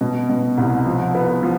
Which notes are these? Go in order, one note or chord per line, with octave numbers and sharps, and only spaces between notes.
B2
B2
C2
F3
B3
F3